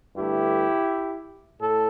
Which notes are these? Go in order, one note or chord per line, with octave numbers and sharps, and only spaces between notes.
G2 D3 A3 E4 G4
A2 A4